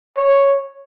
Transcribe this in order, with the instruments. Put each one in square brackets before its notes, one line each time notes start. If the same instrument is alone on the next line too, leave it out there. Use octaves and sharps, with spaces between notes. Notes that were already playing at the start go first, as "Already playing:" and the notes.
[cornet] C#5